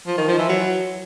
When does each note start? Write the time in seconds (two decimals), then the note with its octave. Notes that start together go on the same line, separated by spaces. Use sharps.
0.07 F3
0.17 D#3
0.28 F3
0.39 E3
0.49 F#3